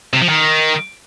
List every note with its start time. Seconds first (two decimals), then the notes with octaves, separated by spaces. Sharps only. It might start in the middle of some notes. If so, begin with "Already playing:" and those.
0.13 C3
0.21 F3
0.29 D#3